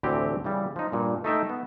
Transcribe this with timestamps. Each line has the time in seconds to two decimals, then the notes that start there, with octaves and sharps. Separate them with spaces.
0.03 D2 A2 E3 C4 G4
0.44 C#3 E3 G3
0.76 F3 D#4
0.92 G2 A#2
1.24 A3 D#4 E5 G5
1.49 B3